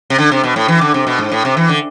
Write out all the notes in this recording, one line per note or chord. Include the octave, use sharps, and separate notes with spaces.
C3
D3
C3
B2
A2
E3
D3
C3
B2
G#2
A2
C3
E3
D3